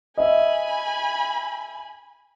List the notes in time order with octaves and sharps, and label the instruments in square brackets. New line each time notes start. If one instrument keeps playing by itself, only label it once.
[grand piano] D#5 E5 [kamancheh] G#5 B5